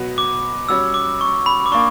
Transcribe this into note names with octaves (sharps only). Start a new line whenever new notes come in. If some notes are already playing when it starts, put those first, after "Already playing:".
Already playing: B2 F#3 B3 F#4
D6
G3 C#4 F#4 C#5 E6
D6
C#6
B5
D6
A#3 D4 C#6